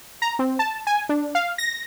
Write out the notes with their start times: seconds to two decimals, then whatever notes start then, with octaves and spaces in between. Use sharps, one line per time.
0.22 A#5
0.39 C4
0.59 A5
0.87 G#5
1.09 D4
1.35 F5
1.58 A#6